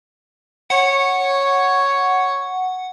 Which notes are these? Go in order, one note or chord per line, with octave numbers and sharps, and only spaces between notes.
C#5 F#5